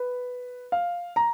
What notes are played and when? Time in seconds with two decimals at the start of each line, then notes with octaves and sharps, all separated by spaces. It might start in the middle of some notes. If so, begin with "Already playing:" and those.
Already playing: B4
0.72 F5
1.16 A#5